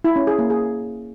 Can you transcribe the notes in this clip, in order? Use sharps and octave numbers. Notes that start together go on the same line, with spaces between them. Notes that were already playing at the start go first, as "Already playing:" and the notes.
E4
C#4
G#4
A#3
G#4